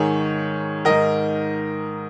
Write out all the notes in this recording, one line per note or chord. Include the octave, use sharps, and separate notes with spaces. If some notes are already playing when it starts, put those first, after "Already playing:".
Already playing: G#2 D#3 G#4 C#5
G#2 D#3 A#4 D#5